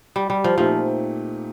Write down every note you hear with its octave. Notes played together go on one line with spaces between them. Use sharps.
G3
G3
F3
A#2 F3 A3 C4 D#4 G4